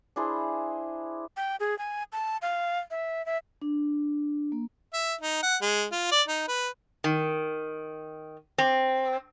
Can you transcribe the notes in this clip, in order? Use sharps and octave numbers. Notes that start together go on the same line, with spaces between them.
D4 E4 G#4 C5
G5
G#4
G#5
A5
F5
E5
E5
D4
A#3
E5
D#4
F#5
G#3
F4
D5
D#4
B4
D#3
C4